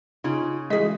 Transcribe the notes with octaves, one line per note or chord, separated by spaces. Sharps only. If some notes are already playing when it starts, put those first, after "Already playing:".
C#3 D#4 F4
G2 E3 G#3 F#4 G#4 D#5 B6